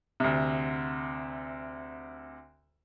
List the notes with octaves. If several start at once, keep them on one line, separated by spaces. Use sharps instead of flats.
D2 C3